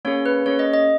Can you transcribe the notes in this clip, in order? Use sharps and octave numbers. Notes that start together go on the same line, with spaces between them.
A#3 C#4 G#4 C#5
B4
A#3 C#4 G#4 C#5
D#5
D#5